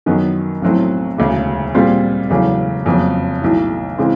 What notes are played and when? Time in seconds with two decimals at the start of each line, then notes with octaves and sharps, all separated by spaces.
0.06 F#2 D#3 F#3 B3
0.62 B1 A2 F#3 A3 C4
1.18 E1 D2 C#3
1.74 A#2 G3 C4 F4 G#4
2.30 E1 E2 C#3 F#3 A3
2.85 F#1 F2 C#3 F#3 B3
3.42 B1 A2 E3
3.98 C#3 E3 G#3 C4